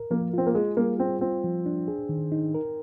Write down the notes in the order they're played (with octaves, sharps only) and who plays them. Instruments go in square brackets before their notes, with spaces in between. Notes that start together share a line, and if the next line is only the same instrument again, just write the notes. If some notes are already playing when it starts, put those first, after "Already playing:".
Already playing: [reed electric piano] A#4
[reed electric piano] F3 [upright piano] A#3
[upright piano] C4 [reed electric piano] F4
[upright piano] A#3
[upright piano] G#3 [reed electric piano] G#4
[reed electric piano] G3 [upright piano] A#3
[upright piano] C4 [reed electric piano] F4
[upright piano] C4 [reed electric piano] F4
[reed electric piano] F3
D4
G#4
D#3
D#4
A#4